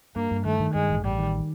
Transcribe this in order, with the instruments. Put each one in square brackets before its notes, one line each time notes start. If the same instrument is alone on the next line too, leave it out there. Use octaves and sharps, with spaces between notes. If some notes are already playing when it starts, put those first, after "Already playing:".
[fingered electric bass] G2 [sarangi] A#3
[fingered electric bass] G2
[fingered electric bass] D#3 [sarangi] A3
[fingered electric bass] D#3
[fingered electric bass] G2 [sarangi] G#3
[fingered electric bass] A1
[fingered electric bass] A1 [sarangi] G3
[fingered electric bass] D#3